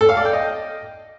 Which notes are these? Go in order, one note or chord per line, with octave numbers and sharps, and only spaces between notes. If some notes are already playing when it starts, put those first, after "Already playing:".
A4
F5
D5
G5
D#5